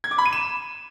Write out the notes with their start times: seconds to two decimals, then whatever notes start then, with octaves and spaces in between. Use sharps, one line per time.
0.04 G#6
0.11 D6
0.18 B5
0.25 D#7
0.33 E7